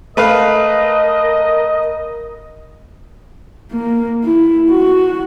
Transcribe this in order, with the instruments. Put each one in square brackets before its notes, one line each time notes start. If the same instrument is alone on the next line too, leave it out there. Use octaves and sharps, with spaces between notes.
[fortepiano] A3 B4 F5 [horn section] A#4 D#5
[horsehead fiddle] A#3
E4
F#4